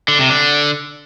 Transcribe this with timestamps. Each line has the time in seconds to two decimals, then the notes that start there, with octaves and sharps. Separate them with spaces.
0.08 D3
0.19 C3
0.30 D3